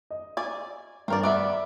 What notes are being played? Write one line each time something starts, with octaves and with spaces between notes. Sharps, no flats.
D#5
D5 G#5
G2 C4 A#4 D5
B3 D5 E5 D6